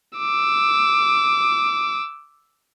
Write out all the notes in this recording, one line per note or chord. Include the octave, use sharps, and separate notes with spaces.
D6 E6